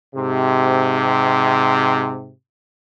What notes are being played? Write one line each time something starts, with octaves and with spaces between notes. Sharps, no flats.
G#2 C3